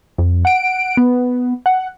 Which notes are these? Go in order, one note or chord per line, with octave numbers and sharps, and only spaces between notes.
F2
F#5 D7
B3
F#5